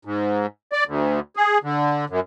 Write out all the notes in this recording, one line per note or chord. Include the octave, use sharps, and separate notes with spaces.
G#2
D5
D2
G#4
D3
F#2